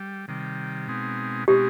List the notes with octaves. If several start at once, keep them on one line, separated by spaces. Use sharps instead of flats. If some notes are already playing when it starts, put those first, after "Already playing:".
Already playing: G3
C3 D#3 G3
B2 G#3 C4 D#4
B2 G#3 C4 D#4 G4